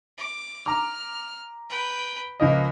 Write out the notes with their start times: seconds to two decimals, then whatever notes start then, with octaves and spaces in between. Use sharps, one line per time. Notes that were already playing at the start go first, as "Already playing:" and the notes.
0.18 D6
0.66 A#5 D6 F6
1.69 B4 G5
2.40 C#2 F3 A#3 D#5